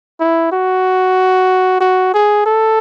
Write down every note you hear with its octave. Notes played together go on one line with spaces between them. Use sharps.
E4
F#4
F#4
G#4
A4